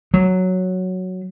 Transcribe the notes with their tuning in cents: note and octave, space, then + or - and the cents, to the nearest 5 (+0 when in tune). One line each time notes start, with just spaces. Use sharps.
F#3 +0